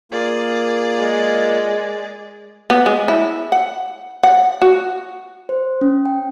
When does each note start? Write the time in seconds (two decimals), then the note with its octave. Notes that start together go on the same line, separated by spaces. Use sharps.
0.12 A#3 F4 G#4 D5
0.99 G#3
2.70 B3
2.86 G#3
3.08 E4
3.52 F#5
4.23 F#5
4.62 F#4
5.49 C5
5.81 C#4
6.05 G5